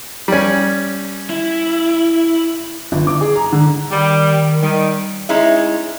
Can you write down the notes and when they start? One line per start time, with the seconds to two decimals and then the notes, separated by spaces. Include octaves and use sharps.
0.28 G3 C#4
1.30 E4
2.92 G1
3.07 D6
3.21 G#4
3.36 A#5
3.52 D3
3.91 D#3 G3
4.62 D#3 G3
5.29 G#3 C#4 D#4 E4